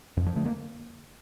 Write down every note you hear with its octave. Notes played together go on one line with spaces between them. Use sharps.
F2
F3
D3 A3
A#3